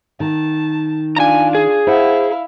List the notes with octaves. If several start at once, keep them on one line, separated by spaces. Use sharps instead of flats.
D#3 A5
D4 F4 G#5 A#5
G#4
E4 C5 F5 F#5